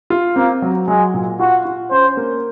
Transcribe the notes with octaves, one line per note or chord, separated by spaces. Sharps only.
F4
A#3 C4
F#3
F#3 G#3
A#2
F4 F#4
F4
C#4 C5
A#3